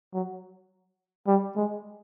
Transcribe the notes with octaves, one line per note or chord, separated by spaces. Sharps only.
F#3
G3
G#3